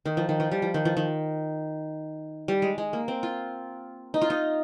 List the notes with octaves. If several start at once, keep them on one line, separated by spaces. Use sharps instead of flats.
D#3
F3
D#3
F3
G3
F3
D#3
F3
D#3
G3
G#3
G#3
A#3
C4
F4
D#4
F4
D#4